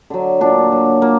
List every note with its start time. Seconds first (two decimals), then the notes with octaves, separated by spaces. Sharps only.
0.10 D3 F#3
0.41 A#2 D4
0.72 F#3
1.02 A#2 A#3